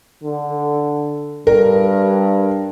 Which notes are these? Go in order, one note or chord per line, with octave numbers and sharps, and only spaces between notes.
D3
G2 A#4